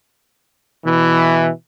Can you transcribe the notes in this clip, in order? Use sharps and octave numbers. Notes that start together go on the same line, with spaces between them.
B2 E3